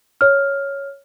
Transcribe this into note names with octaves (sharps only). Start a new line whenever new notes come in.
C#5 F6